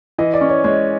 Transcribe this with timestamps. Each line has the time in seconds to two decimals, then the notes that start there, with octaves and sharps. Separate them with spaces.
0.18 E3 D#5
0.34 D5
0.41 C#4
0.49 C#5
0.64 G#3 C#5